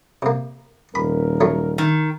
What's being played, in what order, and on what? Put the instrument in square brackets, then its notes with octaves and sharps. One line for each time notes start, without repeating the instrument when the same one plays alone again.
[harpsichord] C3 A#3
[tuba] D#1 [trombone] A#4 [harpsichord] B5
[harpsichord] F#3 A3
[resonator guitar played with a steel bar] D#3